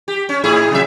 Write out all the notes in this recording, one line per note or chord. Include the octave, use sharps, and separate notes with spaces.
G4
C#4
A2 E4 G#4
C3 F#3 E5